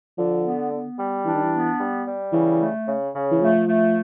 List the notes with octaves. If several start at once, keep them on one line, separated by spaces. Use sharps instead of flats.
D3 F3
B3
B3
G3
E3 D4
D#3
E3
B3
G3
G3
C#3 E3
A3
C#3
C#3
E3
F3 A3
A3